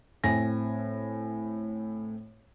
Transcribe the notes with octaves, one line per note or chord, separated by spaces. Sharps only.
A2 C4 G#5 A#6